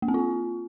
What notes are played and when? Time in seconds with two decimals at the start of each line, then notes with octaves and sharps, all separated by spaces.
0.02 A#3
0.08 C4
0.14 F4